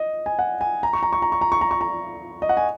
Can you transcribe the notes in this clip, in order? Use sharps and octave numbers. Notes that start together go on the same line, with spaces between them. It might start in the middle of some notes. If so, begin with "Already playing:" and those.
Already playing: D#5
G#5
F#5
G#5
A#5
C#6
A#5
C#6
A#5
C#6
A#5
C#6
A#5
C#6
A#5
D#5
F#5
G#5